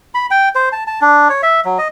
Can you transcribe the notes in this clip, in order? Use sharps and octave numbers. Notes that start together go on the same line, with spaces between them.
B5
G5
C5
A5
A5
D4
C#5
E5
F#3
D#5